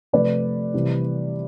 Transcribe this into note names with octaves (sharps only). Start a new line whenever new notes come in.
C3 F3 A3 B4 D5
C3 E3 G3